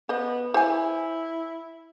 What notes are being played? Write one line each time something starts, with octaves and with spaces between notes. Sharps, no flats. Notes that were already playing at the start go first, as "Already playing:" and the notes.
B3 C5 D#5
E4 C5 C#5 G#5